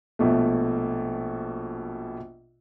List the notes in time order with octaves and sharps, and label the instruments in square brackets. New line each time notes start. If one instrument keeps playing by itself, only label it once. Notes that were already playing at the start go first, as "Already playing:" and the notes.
[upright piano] A#1 B2 A3